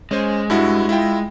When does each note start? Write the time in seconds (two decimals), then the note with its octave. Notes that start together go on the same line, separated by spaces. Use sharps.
0.11 G#3 C#4 C5
0.50 G2 E4 F#4
0.89 E4 F4 G5